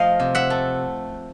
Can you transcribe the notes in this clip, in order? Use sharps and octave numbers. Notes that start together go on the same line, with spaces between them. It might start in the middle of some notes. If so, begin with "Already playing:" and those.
Already playing: F3 A3 D#5 F5
C3
E5 F#5
A3